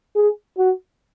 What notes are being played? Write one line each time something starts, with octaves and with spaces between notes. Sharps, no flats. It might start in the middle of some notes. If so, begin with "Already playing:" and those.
G#4
F#4